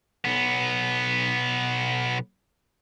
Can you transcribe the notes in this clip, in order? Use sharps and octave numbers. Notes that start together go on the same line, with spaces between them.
B1 B3